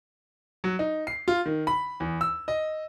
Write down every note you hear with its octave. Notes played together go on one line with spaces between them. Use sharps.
F#3
D#4
C7
F4
D#3
B5
E2
E6
D#5